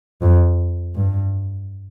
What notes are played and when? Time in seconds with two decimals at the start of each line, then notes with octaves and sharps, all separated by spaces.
0.22 F2
0.95 G2